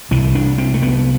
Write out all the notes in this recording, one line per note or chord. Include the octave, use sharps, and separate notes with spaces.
C2 C3 E3
D4
C4
A3
B3